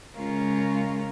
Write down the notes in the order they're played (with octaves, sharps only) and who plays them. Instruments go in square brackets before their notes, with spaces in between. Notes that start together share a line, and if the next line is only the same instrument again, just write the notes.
[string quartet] C#3 G#3 C#4 F4 A#4